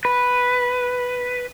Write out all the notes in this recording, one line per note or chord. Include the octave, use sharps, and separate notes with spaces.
B4